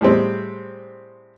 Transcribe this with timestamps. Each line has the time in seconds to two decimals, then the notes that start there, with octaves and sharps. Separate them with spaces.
0.01 A2 G3 G#3 C4